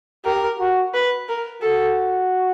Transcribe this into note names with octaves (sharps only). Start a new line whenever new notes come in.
G4 A#4
F#4
B4
A#4
F#4 A4